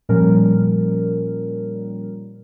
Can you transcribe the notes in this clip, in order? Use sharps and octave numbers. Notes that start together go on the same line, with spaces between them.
A#2 F3 G3 C#4 A#4